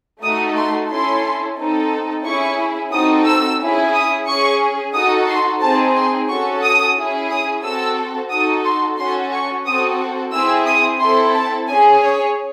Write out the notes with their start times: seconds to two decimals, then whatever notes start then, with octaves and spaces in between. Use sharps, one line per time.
0.22 A3 D#4 F#4 A4 D#6
0.56 C6
0.90 C#4 E4 A4 C6
1.57 C4 D#4 A4
2.24 C#4 E4 G#4 C#6
2.92 C4 D#4 F#4 A4 D#6
3.25 E6
3.59 C#4 E4 G#4
3.94 D#6
4.27 C#4 G#4 C#6
4.94 D#4 F#4 A4 D#6
5.28 C6
5.61 C4 D#4 G#4 A5
5.96 C6
6.29 C#4 F#4 A4 C#6
6.62 D#6
6.96 C#4 E4 G#4
7.30 D#6
7.63 C4 F#4 A4 E6
8.31 D#4 F#4 A4 D#6
8.65 C6
8.98 C#4 F#4 A4 C6
9.32 C#6
9.66 C4 F#4 A4 D#6
10.33 C4 E4 G#4 E6
10.66 D#6
11.00 C4 E4 A4 C6
11.35 A5
11.68 C#4 G#4 G#5
12.02 C#5